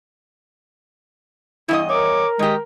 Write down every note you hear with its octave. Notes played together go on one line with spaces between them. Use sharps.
E2 G2 E4 D#5
A#4 C#5 D6
D#3 G#3 G4 D#5